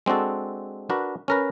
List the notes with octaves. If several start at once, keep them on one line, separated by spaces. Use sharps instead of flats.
G#3 C4 D4 F#4 A4
D4 F#4 A#4 B4
C#4 A#4 B4